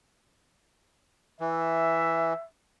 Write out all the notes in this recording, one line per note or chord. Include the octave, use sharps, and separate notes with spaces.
E3 E5